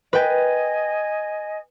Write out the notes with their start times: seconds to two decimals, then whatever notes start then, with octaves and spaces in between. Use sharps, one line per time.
0.13 B4 D#5 G5 G#5